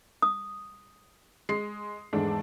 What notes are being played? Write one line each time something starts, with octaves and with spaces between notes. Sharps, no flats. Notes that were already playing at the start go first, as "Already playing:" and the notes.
D#6
G#3 C7
E2 G#2 A3 D4